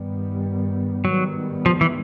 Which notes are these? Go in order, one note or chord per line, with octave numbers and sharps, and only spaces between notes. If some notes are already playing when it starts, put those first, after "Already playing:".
Already playing: G2 D#3 G3 B3
G#2 D#3 F#3 G3 B3
F3
E3